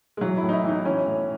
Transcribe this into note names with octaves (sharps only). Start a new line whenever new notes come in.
G#3
E3 F#3
E4
A2
D#4
E4
E3 D#4
E3 C#4
A2